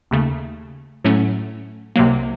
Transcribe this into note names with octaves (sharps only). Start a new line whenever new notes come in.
D#2 C#3 A3
A2 F#3 A3 C#4
C2 C3 F#3 A#3